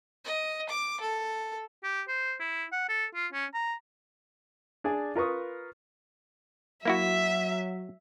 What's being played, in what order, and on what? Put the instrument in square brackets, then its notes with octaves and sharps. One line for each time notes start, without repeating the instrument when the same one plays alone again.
[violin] D#5
D6
A4
[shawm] G4
C5
E4
F#5
A4
F4
C#4
A#5
[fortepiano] D4 G#4 D5 G#5
F4 A#4 B4 C#6 D#6
[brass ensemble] F#3 [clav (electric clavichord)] A#3 E4 F#4 [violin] E5